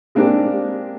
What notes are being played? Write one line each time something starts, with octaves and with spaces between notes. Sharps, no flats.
G#3 A#3 C4 D4 G4